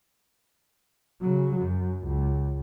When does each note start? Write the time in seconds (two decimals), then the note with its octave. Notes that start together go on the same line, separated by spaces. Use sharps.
1.21 C#3 F#3
1.59 F#2
2.06 C#2